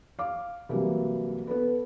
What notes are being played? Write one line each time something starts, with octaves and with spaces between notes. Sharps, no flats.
F5 D6
C2 E3 F#3 G3 A#3
B3 A4 B4